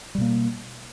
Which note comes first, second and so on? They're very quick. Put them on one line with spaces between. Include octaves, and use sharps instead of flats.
G3 B2 A#3